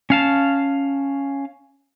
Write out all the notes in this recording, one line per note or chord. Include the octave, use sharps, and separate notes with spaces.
C#4 F5 A5